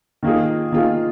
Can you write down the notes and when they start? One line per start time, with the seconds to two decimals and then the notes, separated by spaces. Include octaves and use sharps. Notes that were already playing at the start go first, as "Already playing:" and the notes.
0.23 D#3 A#3 F4 G#4
0.72 D#3 A#3 F4 G#4